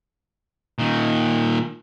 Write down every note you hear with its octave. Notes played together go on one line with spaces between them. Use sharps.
A#2 D#3